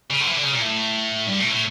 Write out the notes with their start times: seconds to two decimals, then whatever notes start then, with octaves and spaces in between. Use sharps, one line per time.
0.10 C#3
0.20 D3
0.27 E3
0.36 D3
0.43 C#3
0.53 A#2
0.61 A2
1.27 G2
1.40 A2
1.51 A2